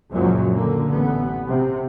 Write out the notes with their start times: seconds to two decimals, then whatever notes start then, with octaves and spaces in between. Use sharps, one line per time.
0.12 C#2 F#2 A#2 F3 F#3
0.52 D3 A#3
0.87 A1 B3
1.48 C3